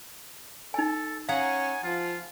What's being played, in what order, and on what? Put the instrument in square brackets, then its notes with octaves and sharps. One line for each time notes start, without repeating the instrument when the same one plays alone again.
[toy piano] D#4 G#5 [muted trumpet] A4
[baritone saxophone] C#4 [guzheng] G#4 F#5 A#5 [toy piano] F5 [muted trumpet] G#5
[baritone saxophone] F3 [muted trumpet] F4